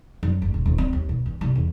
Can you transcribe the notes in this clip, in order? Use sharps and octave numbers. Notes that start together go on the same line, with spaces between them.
F#2
G1
E1
D#1
C4
D#2
B2
E2
C2
E2